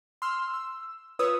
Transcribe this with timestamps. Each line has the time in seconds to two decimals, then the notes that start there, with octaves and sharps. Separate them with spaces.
0.22 C6 E6 F6
0.54 E6
1.19 F4 B4 C#5 D#6 E6